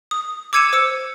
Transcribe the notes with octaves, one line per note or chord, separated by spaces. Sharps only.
D#6
D6 E6 G#6 C#7 D#7 E7
C5 E6 C#7